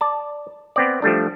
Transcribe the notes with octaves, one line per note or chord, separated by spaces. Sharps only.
D5 A5
B3 C4 D5
F3 G3 A3 D4